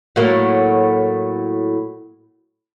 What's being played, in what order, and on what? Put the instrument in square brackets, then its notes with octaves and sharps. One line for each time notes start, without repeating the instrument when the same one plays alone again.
[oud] A2 F#3 A#3